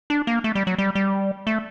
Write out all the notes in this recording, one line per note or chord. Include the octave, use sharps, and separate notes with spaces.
D4
A#3
A3
G3
F#3
G3
G3
A3